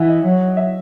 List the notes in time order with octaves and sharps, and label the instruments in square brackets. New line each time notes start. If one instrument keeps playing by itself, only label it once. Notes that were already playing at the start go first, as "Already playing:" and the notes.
Already playing: [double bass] E3 [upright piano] E5 F#5 G#5
[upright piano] D#5
[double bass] F#3
[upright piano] E5